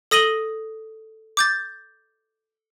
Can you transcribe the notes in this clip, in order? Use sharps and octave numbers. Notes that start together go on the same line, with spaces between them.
A4 D#6 A#6 D#7 F#7 G7
D6 G6 A6